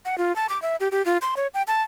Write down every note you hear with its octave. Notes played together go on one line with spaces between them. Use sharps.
F#5
F4
A5
D6
E5
G4
G4
F4
C6
C#5
G5
A5